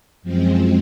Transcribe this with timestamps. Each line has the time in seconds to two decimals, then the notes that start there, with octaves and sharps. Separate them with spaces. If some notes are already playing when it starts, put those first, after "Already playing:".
0.23 F#2 F3 G#3 C4